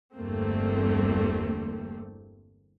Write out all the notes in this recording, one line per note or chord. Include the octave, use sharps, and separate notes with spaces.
G1 E2 G2 A3 A#3 C4